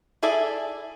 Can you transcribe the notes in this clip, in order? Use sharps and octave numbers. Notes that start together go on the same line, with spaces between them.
E4 G#4 A4 D5 E5